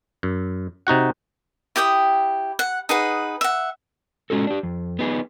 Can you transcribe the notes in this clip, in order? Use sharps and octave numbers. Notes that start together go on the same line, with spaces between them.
F#2
C3 D#4 F#4 F#5
E4 G4 G5 D#6
F#5
D#4 G#4 B4 F#5
E5 F#5
G#3 C#4 F#4 A4
D4 G4
F2
B3 D#4 G#4